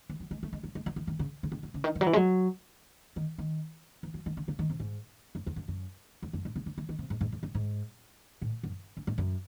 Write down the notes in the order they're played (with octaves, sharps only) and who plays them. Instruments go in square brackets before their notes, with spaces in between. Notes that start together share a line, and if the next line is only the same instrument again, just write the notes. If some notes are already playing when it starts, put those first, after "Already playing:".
[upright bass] E3
F#3
G#3
A3
G#3
F#3
G#3
F#3
E3
D#3
C#3
C#3
C3
F#3
C#3
D#3
D#3
F#3
E3
G#3
F#3
D#3
D#3
E3
F#3
D#3
C#3
C#3
D#3
C3
G#2
F#2
E2
F#2
F#2
E2
F#2
A2
C3
C#3
E3
D#3
C3
G#2
G#2
E2
F#2
G#2
A2
F#2
F#2
G#2
F#2